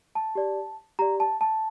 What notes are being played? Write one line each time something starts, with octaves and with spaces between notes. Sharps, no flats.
A5
G4 D5
G4 D5 A#5
A5
A5